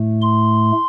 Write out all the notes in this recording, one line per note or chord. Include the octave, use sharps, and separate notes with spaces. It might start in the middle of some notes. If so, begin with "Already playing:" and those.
Already playing: A2 A3
C6